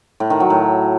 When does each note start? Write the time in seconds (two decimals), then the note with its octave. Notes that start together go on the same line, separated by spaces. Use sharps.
0.20 A2
0.30 D#3
0.40 F#3
0.50 A2